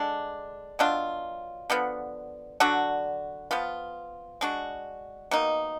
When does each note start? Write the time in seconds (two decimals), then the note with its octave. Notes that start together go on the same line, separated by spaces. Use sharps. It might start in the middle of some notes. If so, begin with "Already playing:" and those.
Already playing: D3 G#3 D4
0.79 B2 F#3 D4 F4
1.70 D3 F3 B3
2.60 D3 F#3 D4 F#4
3.51 F3 B3 F4
4.41 G#3 D4 F#4
5.31 B2 A#3 D#4